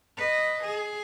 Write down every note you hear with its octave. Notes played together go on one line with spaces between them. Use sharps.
B4 D#5
G#4